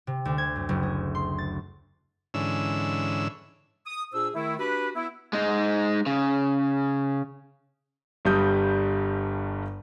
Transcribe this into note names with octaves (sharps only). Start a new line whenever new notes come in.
C3
D2
G#6
F#2
F#1
G#4
C6
A6
G#2 D3 E3 C#4 E6
D#6
A#2 D4 G#4 C5 E6
D#3 A3 E4
D4 F#4 G4 B4
B3 E4
G#3 D#4
C#3
G1 G2 G3 D#6 G6